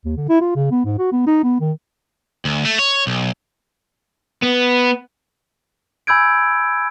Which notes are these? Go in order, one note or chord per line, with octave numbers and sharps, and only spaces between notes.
D#2
D3
E4
F4
C#3
B3
G#2
F#4
B3
D#4
B3
D#3
D2
A3
C#5
B1
B3
G#5 B5 E6 G6 G#6 D7